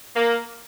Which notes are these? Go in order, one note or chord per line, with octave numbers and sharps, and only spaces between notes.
A#3